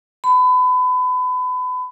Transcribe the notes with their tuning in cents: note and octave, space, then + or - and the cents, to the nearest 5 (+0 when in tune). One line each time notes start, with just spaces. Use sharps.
B5 +30